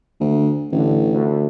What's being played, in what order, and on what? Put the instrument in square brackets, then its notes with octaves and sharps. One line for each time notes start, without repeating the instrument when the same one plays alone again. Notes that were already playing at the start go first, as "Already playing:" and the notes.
[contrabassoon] D2
[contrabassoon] A1 [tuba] D3
[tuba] D2